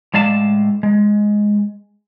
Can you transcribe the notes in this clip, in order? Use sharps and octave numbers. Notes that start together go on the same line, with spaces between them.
A2 G#3 D5 F5 A5
G#3